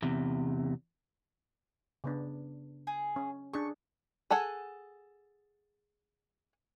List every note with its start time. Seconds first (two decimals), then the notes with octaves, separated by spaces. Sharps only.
0.02 E2 C3
2.04 C#3 B3 D4
2.87 G#4
3.16 C#4
3.53 D4 G#4 C#6
4.31 G#4 A4 F#5 G#5